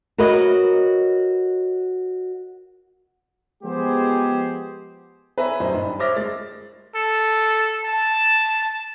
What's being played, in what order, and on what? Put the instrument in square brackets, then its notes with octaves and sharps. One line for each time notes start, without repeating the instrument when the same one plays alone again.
[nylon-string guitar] F#4 A#4 B4 C#5 D#5
[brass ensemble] F3 G#3 B3 G4 G#4 C5
[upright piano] B4 C#5 E5 G#5 A#5
D#1 F#2 G3 C5 D#5 C6
G2
C5 C#5 E5 D6 F6 A#6
G#3 A6
[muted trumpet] A4
A5